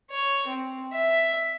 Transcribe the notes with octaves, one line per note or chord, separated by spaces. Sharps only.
C#5
C4
E5